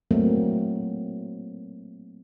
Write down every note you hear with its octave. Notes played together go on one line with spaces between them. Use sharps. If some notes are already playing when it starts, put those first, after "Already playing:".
F#3 A3 A#3 C4